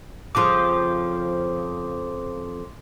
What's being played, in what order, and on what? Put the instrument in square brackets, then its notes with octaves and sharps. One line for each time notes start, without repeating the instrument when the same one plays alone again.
[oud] F2 C#3 F3 [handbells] C6 D6